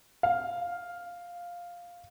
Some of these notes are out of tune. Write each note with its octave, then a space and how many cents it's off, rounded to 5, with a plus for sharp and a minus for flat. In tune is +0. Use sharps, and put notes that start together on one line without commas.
F5 +5